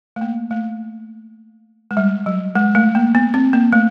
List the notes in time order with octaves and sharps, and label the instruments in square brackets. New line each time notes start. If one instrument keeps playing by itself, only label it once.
[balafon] A3
A#3
A3
G#3
G3
F#3
G#3
A3
A#3
B3
C4
A#3
A3